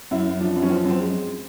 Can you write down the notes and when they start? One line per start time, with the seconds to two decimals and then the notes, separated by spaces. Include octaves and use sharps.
0.11 F#2 E4
0.26 F#2
0.41 F3 D4
0.56 F#2
0.63 C#4
0.70 F3 C4
0.84 F#2
0.90 C4
1.00 G#3